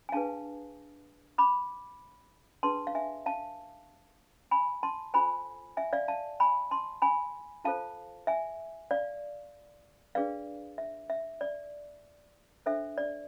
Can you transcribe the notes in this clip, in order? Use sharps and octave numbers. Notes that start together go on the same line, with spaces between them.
G#5
D4 G#4 B4 F5 A5
B5 D6
D4 G#4 B4 A5 C6
F5
E5 G#5
F5 A5
G#5 B5
A5 C6
F4 A4 C5 G#5 B5
E5 G#5
D5 F5
F5 A5
G#5 B5
A5 C6
G#5 B5
F4 A4 C5 F5 A5
E5 G#5
D5 F5
D4 G#4 B4 D5 F5
E5
E5
D5
D4 A4 C5 E5
D5